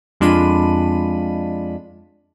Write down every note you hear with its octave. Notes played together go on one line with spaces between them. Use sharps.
F2 G#3 D4 F4 B5 D#7